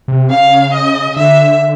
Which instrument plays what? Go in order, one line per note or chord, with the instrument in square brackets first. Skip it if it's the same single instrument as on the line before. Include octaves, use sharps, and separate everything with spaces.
[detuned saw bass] C3
[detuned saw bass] C#3 [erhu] F5
[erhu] D#5
[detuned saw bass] D3 [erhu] E5